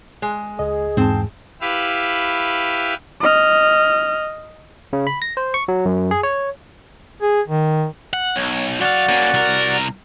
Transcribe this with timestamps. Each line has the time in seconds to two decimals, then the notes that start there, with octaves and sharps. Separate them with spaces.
0.22 G#3
0.59 C#2 G#4 D#5
0.97 E2 G#2 C4 A5
1.61 E4 G4 B4 F5 E6
3.21 D#5 F6
4.93 C#3
5.07 B5
5.22 A#6
5.37 C5
5.54 C#6
5.68 F#3
5.86 F#2
6.11 G#4
6.23 C#5
7.22 G#4
7.47 D#3
8.13 F#5
8.36 B1 C#5
8.81 F#2 F#4 D5 F5 F#5
9.09 A#3 C#4
9.34 C2 A#4